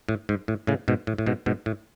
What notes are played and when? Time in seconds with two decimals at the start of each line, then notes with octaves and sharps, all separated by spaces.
0.09 A2
0.29 G#2
0.48 A2
0.67 A2 C#3
0.88 G#2 B2
1.07 A2
1.18 A2
1.27 G#2 B2
1.46 G#2 B2
1.66 A2